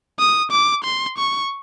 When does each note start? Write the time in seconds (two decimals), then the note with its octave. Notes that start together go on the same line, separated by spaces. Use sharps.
0.19 D#6
0.51 D6
0.84 C6
1.18 C#6